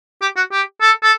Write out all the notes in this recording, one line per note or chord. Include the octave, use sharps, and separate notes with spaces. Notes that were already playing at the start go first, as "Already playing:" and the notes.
G4
F#4
G4
A4
A4